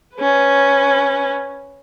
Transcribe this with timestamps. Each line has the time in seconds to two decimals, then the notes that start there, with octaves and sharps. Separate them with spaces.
0.16 C#4 B4